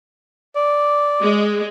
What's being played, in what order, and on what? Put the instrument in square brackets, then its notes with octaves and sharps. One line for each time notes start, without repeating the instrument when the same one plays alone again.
[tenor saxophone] D5
[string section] G#3